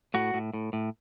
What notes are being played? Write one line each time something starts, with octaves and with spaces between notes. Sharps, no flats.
A2 F#4
A2
A2
A2